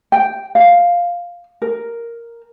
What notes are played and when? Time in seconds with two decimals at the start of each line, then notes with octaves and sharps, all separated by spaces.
0.12 G5
0.55 F5
1.62 A#4